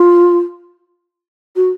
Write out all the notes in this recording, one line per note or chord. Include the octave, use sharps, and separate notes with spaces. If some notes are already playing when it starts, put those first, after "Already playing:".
Already playing: F4
F#4